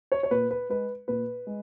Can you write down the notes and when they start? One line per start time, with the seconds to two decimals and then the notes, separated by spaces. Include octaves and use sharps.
0.12 C#5
0.23 C#5
0.31 A#2 B4
0.51 B4
0.69 G#3 B4
1.08 A#2 B4
1.47 G#3